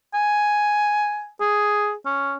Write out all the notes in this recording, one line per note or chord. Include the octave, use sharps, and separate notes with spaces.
G#5
G#4
C#4